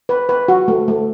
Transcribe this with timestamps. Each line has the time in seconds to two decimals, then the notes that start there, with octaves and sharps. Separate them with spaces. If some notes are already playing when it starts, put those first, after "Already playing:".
0.09 B4
0.29 B4
0.48 F#4
0.68 A3
0.88 A3